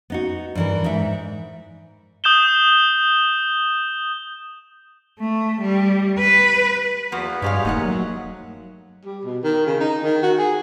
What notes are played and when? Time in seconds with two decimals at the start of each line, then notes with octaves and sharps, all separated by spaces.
0.10 B3 D#4 F#4
0.55 G2 E3 A#4
0.84 G#2 D#4 E5
2.24 D#6 G6 E7 G7
5.20 A3
5.61 G3
6.18 B4
7.12 E2 F3 A#3 B3 F#4
7.42 G2 F#3 G#3 G4 C#5 D5 F5
7.65 D#1 G#2 A3 A#3 D#4 D#5 F#5
7.86 F#3
9.05 G3
9.25 B2
9.43 D#3
9.67 C#3
9.80 D#4
10.04 D#3
10.23 F#4
10.38 G#4